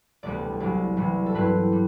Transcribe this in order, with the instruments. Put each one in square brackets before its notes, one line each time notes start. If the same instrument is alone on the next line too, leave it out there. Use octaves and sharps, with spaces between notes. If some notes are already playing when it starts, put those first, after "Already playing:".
[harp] E1 D2 C3 G3 B3 D5
C2 C3 F#3 D5
C2 C3 E3 G3
A4
G2 F#3 C4 E4 B4
G3